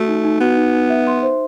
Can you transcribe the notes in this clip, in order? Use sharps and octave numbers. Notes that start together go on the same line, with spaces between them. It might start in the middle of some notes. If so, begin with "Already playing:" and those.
Already playing: A3 F#4
D#4
D#4
B3 F#4
D#4
D#4
E5
C6
C5